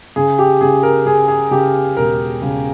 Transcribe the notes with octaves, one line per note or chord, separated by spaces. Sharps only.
C#3 G#4
G4
C#3 G#4
A#4
C#3 G#4
G#4
C#3 G4
E1 A#4
C#3